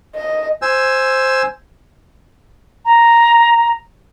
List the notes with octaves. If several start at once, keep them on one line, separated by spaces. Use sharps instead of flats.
D#5
C5 G#5 E6
A#5